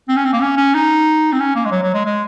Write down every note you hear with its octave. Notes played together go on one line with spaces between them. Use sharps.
C4
C#4
C4
A#3
C#4
C#4
D#4
C4
C#4
A#3
G#3
F#3
F#3
G#3
G#3